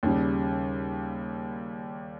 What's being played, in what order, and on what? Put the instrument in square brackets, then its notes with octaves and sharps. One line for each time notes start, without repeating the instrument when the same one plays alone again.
[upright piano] D#2 C#3 G3